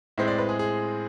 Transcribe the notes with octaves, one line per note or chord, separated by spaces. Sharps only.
A2 G#3 C4 E5
D5
B4
G#4
G#4